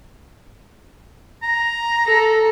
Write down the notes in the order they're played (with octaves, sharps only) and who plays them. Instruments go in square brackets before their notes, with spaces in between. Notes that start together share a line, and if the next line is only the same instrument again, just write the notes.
[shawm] A#5
[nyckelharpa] A4